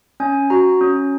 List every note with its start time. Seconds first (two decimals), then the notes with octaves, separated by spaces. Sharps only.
0.20 C#4 G#5
0.50 F#4 A#5
0.81 C#4